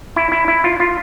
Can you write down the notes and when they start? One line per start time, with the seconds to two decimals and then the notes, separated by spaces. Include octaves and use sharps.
0.16 E4
0.32 E4
0.48 E4
0.64 F4
0.80 F4